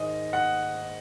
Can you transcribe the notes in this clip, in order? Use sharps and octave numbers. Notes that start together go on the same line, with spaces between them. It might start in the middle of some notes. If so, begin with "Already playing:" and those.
Already playing: G#2 D#3 G#3 D#5
F#5